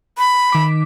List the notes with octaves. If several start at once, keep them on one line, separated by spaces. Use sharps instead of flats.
B5
D#3 D6 B6